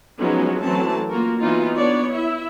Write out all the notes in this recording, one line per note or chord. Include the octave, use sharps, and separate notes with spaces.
F3 F#3 G#3 B3 C#4 D#4
E3 F#3 A3 C4 C#4 A5
A#3 F4 F#4 A#4
E3 F#3 B3 D#4 F4
B3 D4 C#5 D5
E4 E5